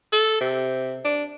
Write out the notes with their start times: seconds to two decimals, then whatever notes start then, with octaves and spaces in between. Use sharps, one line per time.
0.12 A4
0.41 C3
1.05 D4